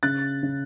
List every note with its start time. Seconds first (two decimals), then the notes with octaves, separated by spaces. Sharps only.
0.03 C#3 F#6 A6
0.43 C#3